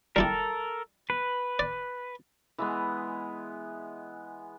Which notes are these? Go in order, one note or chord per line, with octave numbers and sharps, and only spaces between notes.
G3 E4 G4 A4 A#4
B4
D5
E3 G#3 B3